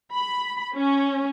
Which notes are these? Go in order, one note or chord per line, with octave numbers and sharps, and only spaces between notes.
B5
C#4